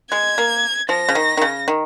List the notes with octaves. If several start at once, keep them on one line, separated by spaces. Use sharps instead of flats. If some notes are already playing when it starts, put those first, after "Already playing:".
G#3 G#6
A#3
F3 A#6
C#3
D#3
D#3
C#3
D#3